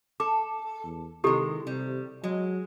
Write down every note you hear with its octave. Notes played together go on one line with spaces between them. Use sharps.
A4 D6
E2
C3 D#3 G#3 E4 G4 A4
C3 G3
F#3 G#3